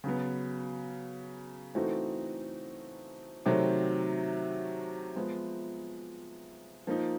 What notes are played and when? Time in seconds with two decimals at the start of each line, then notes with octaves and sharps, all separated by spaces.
0.04 C#3 F#3 B3
1.75 E3 A3 C4 D#4 F#4
3.46 C3 D#3 F#3 A3 C4
5.16 F3 G#3 B3
6.87 F3 A#3 D#4